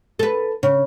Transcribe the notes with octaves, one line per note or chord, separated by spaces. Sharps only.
A4 B4
C#3